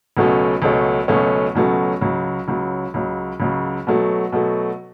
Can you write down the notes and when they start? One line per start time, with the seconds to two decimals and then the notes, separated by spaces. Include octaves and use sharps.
0.17 C#2 B2 F#3 A3 C#4
0.62 C#2 B2 F#3 A3 C#4
1.08 C#2 B2 F#3 A3 C#4
1.55 C#2 B2 F#3 A3 C#4
2.01 C#2 C#3 F#3
2.48 C#2 C#3 F#3
2.94 C#2 C#3 F#3
3.40 C#2 C#3 F#3
3.87 B2 F#3 A3
4.32 B2 F#3 A3